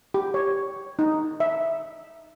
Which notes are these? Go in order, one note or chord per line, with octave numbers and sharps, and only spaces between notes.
G4
C#5
D#4
E5